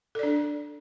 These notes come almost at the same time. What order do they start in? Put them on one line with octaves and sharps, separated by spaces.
A4 D5 D4